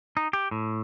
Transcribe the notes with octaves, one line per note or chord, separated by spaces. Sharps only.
D#4
G4
A2